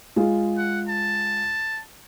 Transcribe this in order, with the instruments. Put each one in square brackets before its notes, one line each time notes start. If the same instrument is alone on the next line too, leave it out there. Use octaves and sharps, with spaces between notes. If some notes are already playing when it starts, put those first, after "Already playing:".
[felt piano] G#3 F4
[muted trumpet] F#5
A5